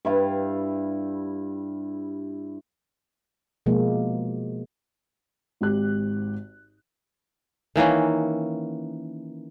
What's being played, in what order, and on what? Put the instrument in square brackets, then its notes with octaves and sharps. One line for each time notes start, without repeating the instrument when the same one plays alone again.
[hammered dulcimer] G2 E4 F5
[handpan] B2 F3 G#3 A#3
[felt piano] G#1 G#2 G4 F#6
[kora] D#3 E3 A#3 C#4